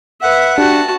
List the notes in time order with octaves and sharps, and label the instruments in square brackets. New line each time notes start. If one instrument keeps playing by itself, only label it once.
[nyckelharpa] B4 E5 [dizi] F#5
[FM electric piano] D4 G4 [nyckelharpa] F#4 A5